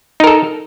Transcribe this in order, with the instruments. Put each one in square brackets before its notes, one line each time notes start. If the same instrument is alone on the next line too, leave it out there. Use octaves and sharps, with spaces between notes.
[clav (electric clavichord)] D#4
A#4
A4